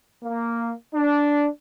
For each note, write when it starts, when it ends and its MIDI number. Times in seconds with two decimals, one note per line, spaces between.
0.23 0.72 58
0.94 1.48 62